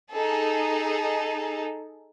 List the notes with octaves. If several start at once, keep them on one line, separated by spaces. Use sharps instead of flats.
D#4 G#4 A4